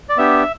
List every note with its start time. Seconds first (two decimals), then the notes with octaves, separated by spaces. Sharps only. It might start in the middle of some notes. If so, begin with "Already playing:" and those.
0.09 D5
0.17 B3 D4 G4 E5